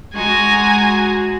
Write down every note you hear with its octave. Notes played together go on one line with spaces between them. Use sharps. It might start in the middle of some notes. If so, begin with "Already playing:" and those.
G#3 F#4 G#5 A#5